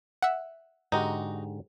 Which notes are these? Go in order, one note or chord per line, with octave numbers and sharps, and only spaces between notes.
E5 F#5
G#2 D3 D#4 F#4 G4